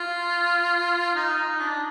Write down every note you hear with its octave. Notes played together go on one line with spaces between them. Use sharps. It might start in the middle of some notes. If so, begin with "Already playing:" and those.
Already playing: F4
D#4
D#4
D4